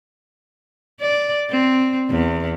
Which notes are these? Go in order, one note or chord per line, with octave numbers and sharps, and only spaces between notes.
D5
C4
E2